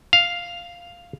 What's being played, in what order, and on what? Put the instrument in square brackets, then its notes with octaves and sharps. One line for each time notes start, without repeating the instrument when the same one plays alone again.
[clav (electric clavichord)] F5